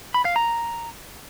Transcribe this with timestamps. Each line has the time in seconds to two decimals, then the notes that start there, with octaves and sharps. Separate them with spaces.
0.14 B5
0.25 F5
0.36 A#5